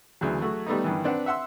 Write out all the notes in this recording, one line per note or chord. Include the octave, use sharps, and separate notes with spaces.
D2 C#3 E3 F#3
F#3 A3 F#4 G#4
G3 A3 B3 D#4
G2 D#3 E3
C4 D4 B4 F#5
E5 F#5 C6 E6